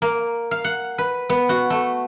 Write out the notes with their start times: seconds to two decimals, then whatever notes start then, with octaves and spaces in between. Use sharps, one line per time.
0.02 A#3
0.51 F5
0.64 F#5
0.98 B4
1.29 B3
1.49 F#4
1.70 A3